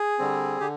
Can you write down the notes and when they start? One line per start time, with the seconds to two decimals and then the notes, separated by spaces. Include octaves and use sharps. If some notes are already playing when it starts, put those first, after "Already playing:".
Already playing: G#4
0.19 D3 G3 C4
0.60 D3 G4